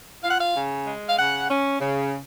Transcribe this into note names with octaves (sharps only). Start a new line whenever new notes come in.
F4 F5
F#5
F5
C#3
G#3
F5
C#3 F#5
C#4
C#3